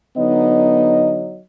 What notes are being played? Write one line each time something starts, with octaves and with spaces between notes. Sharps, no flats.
D3 F#3 B3 D#4 D#5